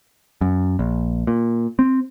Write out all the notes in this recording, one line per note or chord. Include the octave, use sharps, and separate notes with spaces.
F#2
A#1
A#2
C4